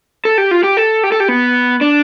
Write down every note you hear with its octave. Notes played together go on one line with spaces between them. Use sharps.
A4
G4
F4
G4
A4
G4
A4
G4
B3
D4